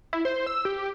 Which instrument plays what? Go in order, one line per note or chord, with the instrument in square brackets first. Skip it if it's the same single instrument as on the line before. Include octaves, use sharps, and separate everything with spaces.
[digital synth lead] E4
C5
E6
G4